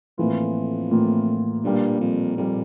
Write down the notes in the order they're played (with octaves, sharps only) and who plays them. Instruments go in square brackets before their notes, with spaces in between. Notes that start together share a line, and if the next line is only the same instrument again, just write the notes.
[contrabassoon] F2 [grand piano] A2 E3 A#3 F4
[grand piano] A2 E3 A#3 F4
[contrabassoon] G2 [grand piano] A#2 G3 A#3
[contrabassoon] F2
[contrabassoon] F2 [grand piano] A#2 G3 A#3